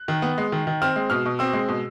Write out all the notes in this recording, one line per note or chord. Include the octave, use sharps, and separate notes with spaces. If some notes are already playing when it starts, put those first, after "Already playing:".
Already playing: F#6
D#3
B3
G#3
D#3
D#3
C4 F6
G#3
B2 F6
B2
C4 E6
G#3
B2